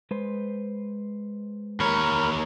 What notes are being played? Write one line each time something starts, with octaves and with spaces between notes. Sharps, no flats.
G#3 B4 C5
D#2 A#4 C#5 B5